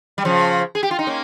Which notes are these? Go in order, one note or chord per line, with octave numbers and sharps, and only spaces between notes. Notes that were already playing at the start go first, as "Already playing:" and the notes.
G3
C#3 F3
G#4
G4
F4
D#4
A#3 C#4